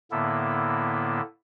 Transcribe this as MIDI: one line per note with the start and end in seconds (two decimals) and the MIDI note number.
0.11 1.21 45
0.11 1.21 50
0.11 1.21 58
0.11 1.21 59
0.11 1.21 64
0.11 1.21 69